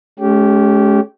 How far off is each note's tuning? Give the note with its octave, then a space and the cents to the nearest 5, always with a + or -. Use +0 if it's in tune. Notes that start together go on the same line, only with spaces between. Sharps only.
G#3 +45 C#4 +10 G4 -15